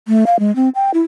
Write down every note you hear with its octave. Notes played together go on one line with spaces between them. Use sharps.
A3
F5
G#3
C4
G5
E4